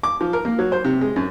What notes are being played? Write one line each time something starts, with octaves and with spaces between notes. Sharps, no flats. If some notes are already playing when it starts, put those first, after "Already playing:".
D6
F3
A#4
A#3
F#3
C5
C3
G#3
F#2